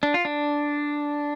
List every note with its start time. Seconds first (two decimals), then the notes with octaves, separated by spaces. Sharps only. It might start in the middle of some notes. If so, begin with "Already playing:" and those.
0.03 D4
0.14 F4
0.25 D4